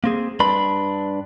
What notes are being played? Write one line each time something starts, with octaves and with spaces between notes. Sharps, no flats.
A#3 C4 G#4
G2 D4 B4 B5 C6